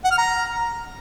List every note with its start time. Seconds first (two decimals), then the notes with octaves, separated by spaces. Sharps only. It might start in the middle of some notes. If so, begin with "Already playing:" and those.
0.04 F#5
0.11 F6
0.18 A#5